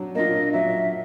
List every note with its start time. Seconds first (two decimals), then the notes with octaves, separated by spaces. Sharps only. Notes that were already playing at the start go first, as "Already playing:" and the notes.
Already playing: F#3 D4
0.15 A#3 D4 F4 D#5
0.53 F#3 E5